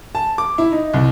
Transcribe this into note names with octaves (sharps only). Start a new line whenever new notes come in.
A5
D6
E4
D#4
C2